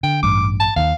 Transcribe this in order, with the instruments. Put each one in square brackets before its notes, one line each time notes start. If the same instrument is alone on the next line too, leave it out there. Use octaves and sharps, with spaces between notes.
[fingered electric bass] D3 [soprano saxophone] G5
[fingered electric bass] A1 G2 [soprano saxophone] D6
[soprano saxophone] A5
[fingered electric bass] D#2 D#3 [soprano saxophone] F5